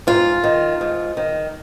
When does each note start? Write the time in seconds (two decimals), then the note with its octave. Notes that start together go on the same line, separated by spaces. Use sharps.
0.07 G#2 F4
0.44 D#3
0.81 G#2
1.17 D#3